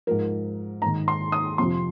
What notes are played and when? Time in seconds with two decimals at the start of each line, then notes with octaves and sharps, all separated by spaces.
0.07 G#2 F3 A#4
0.82 G#2 D#3 A#5
1.08 C6
1.32 D#6
1.58 F2 C3 F3 C6